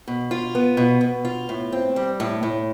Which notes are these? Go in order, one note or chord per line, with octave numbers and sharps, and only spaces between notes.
B2
F4
B3
B2
B2
F4
A2
C4
G3
A2
A2